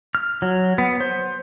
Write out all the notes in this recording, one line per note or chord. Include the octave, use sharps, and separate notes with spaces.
F6
F#3
B3
C5